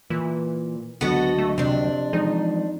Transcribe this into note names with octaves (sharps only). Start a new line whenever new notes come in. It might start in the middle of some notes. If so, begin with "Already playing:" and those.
A#2 E3
C#2 D3 F#3 B3 F#4 A4 D#5
A3
F2 C3 D4
E3 F3 G#3 D#4